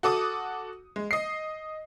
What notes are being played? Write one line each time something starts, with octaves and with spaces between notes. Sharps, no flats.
F#4 A4 D6 D#6
G#3
D#5 C7